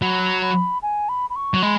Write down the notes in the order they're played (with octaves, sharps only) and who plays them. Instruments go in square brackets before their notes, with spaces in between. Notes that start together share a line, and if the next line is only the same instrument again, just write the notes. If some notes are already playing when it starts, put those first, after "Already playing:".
[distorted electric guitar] F#3 [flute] B5
[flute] B5
G#5
B5
B5
C#6
[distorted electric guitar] F#3
[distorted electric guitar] G#3 [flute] B5